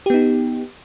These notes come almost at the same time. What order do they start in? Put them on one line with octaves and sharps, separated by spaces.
G4 B3 D#4